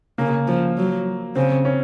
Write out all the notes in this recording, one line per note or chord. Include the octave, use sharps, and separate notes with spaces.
C#3 A#3
F3
F#3
C#3 C4
C#4